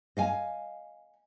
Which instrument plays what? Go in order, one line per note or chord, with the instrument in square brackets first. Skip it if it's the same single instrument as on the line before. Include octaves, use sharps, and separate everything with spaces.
[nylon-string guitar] D#5 F5 G#5